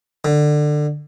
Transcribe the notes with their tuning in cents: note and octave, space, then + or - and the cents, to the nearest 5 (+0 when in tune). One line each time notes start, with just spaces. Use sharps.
D3 +20